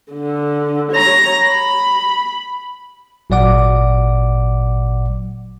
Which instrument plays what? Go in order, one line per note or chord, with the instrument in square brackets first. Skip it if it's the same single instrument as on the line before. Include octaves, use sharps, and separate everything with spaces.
[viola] D3
C#5 A#5
B5
[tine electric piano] G#1 A#2 F#3 D5 F#5 D6